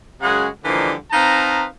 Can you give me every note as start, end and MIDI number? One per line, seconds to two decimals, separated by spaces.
0.21 0.46 42
0.21 0.46 49
0.21 0.46 56
0.21 0.46 66
0.21 0.46 78
0.21 0.46 80
0.63 0.92 50
0.63 0.92 52
0.63 0.92 53
0.63 0.92 55
0.63 0.92 58
0.63 0.92 63
1.11 1.65 60
1.11 1.65 63
1.11 1.65 71
1.11 1.65 77
1.11 1.65 81
1.11 1.65 82